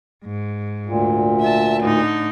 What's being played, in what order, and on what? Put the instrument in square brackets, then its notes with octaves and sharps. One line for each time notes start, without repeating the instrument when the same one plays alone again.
[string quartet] G#2
[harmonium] D2 A#2
[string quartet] E5 A5
A2 D3 D#4